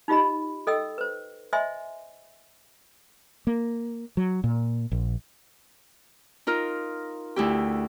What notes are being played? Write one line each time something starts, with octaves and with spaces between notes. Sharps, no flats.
D#4 F4 G4 D#5 B5
A4 D#5 G5 E6
B4 C5
C5 D#5 E5 G#5 C6
A#3
F#3
A#2
A#1
D#4 F4 A#4
D2 E4 G4